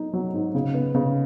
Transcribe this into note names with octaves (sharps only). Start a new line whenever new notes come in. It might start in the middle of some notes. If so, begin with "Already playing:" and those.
Already playing: F#3 D#4
F#3
G#2
C#3
B3
C#3